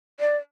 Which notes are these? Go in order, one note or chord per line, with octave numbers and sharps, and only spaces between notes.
D5